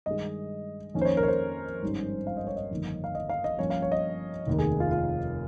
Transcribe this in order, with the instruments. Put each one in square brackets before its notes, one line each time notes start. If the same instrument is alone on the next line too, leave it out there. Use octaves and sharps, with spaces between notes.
[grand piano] G2 D#3 G#3 D#5
F2 D#3 A#3 C#4
C5
C#5
A#4
C#5
C5
G#1 G2 D#3 G3 C#4
F5
D#5
C#5
D#5
G1 F2 D#3 A#3
F5
D#5
F5
D#5
G2 F3 A#3 C#4 C#5
F5
C#5
D#5
F1 D#2 D#3
G#4
F4
F4